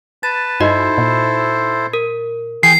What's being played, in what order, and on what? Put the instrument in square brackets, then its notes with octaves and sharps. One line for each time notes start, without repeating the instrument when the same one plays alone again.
[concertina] B4 A5 [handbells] A6
[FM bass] G2 [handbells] D#4 F#4 D#5 [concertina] E4 A4 C5
[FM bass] A#2
[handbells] A#4
[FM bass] E3 [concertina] G#4 G5 G#5 [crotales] C7